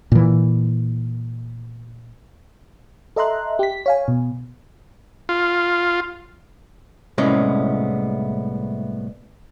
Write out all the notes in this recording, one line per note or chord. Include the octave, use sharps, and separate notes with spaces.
A#2 E3
A4 D#5 E5 A#5 C6 F#6
G4 B6
C#5 F5 G#5
B2
F4
C2 A2 G#3 B3 C#4 D5